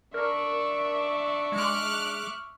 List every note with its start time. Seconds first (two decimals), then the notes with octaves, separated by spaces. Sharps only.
0.14 D4 A#4 E5 C#6
1.52 G#3 D6 F6 F#6